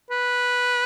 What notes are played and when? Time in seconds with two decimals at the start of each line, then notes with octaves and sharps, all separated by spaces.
0.11 B4